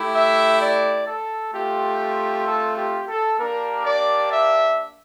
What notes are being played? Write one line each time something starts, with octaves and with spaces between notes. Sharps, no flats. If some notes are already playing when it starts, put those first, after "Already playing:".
Already playing: A3 E4 G4
E5
D5
A4
A3 C4 F4 G4
A4
G4
A4
A#3 D4 G4 A#4
D5
E5